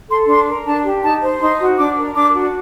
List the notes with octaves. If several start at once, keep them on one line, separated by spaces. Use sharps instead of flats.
A4 C6
D4 C6
A#4
D4 A5
G4
D#4 A5
C5
D#4 C6
F#4
D4 D6
A#4
D4 D6
F#4